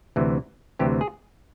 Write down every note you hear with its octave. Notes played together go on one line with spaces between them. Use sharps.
D2 C3 E3
D2 C3 E3 G4
G#4